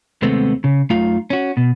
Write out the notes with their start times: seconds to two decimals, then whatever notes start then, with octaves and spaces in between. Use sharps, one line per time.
0.22 D#2 C3 G#3 A3 B3 C4
0.64 C#3
0.90 F#2 A3 D#4 F4 F5
1.30 C#4 F#4
1.57 B2